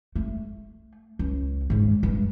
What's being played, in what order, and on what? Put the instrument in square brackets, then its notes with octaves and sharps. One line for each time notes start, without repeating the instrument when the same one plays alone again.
[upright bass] A3
C#2
D#2 G#2
G2